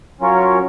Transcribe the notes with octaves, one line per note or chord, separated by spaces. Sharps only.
F#3 C#4 F4 A#4 C#5